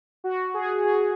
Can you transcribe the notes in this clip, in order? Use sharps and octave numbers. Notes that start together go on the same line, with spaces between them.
F#4
G#4
G#4